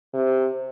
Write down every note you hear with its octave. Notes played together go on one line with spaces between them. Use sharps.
C3